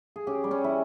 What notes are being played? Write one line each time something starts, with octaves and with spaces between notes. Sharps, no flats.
G#4
C#4 G4
G3
C#4
E4